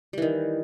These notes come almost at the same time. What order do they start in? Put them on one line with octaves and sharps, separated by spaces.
G3 E3 D#3